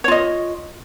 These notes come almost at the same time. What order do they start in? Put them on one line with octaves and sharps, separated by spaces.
C#5 F4 D#5